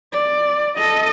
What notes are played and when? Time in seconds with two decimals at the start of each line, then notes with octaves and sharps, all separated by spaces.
0.13 D5
0.77 A4 D#5